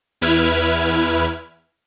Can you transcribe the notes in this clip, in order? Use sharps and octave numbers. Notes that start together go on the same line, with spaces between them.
E2 E4 B4 F6 G#6